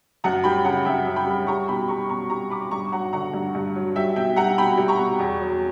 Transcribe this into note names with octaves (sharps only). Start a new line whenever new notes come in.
F#2 F#5 A#5
G3 G5 B5
C#3 F#5 A#5
F#2 E5 G5
F#2
G5 B5
G3
G3 A#5 C#6
B2 G5 B5
G3 A#5 C#6
B2 A#5 C#6
G3 A#5 C#6
B2 B5 D6
G2 A#5 C#6
F#3 F#5 A#5
D3 F#5 A#5
G2
G2
F#3
G3 E5 G5
B2 E5 G5
G3 F#5 A#5
B2 G5 B5
G3
A#5 C#6
B2
E2
F#3